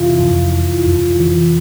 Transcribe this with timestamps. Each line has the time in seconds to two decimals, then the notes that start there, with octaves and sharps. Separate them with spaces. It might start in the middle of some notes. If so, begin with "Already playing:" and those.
Already playing: F2 C3 E3 E4 F4
0.19 F2
0.52 F2
0.86 F2
1.20 E3